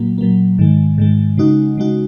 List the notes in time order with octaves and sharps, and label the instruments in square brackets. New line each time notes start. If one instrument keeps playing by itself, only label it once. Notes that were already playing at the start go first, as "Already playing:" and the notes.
Already playing: [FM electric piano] A#2 F#3 A#3
A#2 F#3 A#3
G#2 D#3 G#3
G#2 D#3 G#3
C#3 G#3 D#4 F#4
C#3 G#3 D#4 F#4